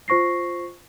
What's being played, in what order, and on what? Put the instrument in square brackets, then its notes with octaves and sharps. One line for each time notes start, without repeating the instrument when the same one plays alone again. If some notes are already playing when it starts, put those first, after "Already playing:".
[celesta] F4 C5 C#6 A#6 C7